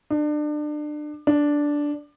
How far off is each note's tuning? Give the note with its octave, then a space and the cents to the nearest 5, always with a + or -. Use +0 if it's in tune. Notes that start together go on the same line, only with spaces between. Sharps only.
D4 +30
D4 -5